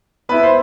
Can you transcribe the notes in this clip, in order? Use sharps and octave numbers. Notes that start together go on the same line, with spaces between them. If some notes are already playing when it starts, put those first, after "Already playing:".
B3 E4 B4
C5